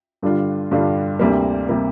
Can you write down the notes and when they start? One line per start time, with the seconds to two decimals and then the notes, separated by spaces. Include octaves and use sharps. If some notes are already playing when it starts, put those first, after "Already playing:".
0.22 G2 D3 G3 D4 F4
0.71 G2 D3 G3 D4 F4
1.20 D2 C3 G3 A#3
1.69 C3 G3 A#3